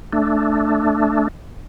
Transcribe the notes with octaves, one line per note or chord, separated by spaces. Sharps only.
A3 D4